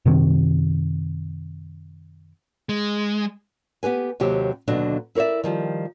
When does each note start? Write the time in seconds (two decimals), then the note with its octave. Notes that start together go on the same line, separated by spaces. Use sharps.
0.05 F#2 C3 D#3 C4
2.69 G#3
3.83 B3 G4 B4 G#5
4.20 D#2 C3 F#3 G4 C5
4.68 D#2 B2 D3 F#3 D4 F5
5.15 E4 A#4 C#5 D5 E5
5.44 D#3 F3 G3